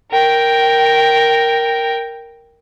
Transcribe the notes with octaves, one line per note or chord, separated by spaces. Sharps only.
A#4 G5